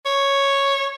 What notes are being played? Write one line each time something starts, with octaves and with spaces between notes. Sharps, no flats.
C#5